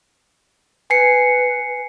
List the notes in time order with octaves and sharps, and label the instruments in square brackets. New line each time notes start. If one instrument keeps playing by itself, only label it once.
[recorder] B4 [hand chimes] G#5 C7 C#7